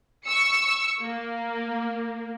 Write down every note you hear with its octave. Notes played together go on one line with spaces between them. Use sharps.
C#6 E6 C#7
A#3